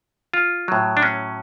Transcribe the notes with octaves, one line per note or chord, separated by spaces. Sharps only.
F4
A2 F#3
D4
C#4